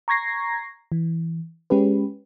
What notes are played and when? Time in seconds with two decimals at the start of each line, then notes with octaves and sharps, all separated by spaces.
0.08 A#5 C#6 G#6 A#6 C7
0.92 E3
1.70 G#3 C#4 G4 B4